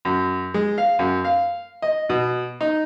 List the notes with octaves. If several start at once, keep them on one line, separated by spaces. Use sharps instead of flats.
F#2
G#3
F5
F#2
F5
D#5
B2
D#4